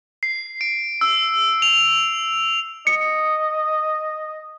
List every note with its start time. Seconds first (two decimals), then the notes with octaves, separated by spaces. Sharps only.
0.23 C7
0.61 D7
1.01 E6
1.62 F7
2.87 D#5 C#7